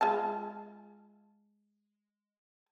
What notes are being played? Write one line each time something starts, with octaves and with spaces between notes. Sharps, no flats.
G#3 F4 A5